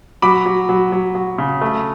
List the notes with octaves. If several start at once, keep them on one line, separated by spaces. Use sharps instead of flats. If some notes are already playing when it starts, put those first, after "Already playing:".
F#3 B5 D6
F#3
F#3
F#3
F#3
C#3
A3